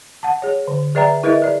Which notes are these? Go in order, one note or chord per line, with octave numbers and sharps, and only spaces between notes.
F#5 A5
G#4 C#5
D3
G#4 B4 D5 E5 G5 A#5
E4 G#4 A#4 B4 D#5 E5
G#4 D5